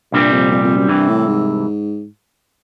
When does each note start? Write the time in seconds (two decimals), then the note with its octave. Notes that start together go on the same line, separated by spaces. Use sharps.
0.12 C2 G2 A#2 G3 C4
0.31 F2
0.51 F2
0.63 F2
0.76 F#2
0.89 C2 G2 C3 E3
1.08 A2
1.27 G#2